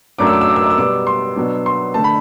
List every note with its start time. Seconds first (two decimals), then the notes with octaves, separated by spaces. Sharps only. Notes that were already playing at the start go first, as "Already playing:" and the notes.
0.19 F#2 F#3 A3 D4 D6
0.27 E6
0.33 D6
0.41 E6
0.49 D6
0.56 E6
0.64 D6
0.70 E6
0.77 B2 G3 B3 D6
1.07 C6
1.36 B2 F#3 B3 D4
1.66 C6
1.94 D3 A3 A5
2.04 B5